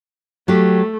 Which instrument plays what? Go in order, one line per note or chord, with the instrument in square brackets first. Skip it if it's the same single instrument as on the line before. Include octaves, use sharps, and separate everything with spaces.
[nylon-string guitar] F#3 F#4 G4 [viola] A3